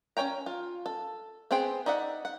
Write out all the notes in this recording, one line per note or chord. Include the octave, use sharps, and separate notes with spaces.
C#4 B4 C#5 G5 A#5
F4
A4
B3 C4 G#4 C5 G5
D#4 D5 E5 F#5
F#5